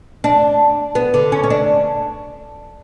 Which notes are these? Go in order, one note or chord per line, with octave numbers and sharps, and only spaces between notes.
D4
B3
D3
C#4
C#4
D4